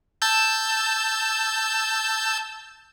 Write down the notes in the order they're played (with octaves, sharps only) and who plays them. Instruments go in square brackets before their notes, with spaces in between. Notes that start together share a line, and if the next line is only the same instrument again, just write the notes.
[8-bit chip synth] A5 E6 G6